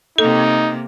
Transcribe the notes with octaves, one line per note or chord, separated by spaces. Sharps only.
C3 A#3 D#4 A4